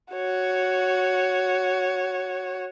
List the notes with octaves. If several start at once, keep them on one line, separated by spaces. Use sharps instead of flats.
F#4 C#5